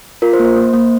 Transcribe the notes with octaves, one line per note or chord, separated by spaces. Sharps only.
F4 A#4
C5
A#3
C5
A#3
A#3